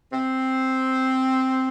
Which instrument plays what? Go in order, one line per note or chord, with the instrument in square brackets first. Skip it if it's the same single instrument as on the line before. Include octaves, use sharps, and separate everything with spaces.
[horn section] C4